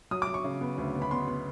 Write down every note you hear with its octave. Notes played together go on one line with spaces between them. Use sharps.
F#3 D#6
D6
F#3
C#6
C#3
B3
D2
B3
B5
B3 C6
B3